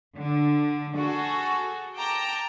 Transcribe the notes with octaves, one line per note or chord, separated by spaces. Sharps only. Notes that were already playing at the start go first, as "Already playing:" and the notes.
D3
F#4 G#4 A4
G5 A5 A#5 D6